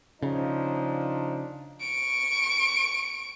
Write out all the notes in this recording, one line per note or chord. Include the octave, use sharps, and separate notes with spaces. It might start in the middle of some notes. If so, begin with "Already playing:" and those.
C#3 F3 D4 D#4
C#6 D7